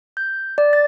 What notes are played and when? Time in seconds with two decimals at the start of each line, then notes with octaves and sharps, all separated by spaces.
0.17 G6
0.58 D5
0.73 A6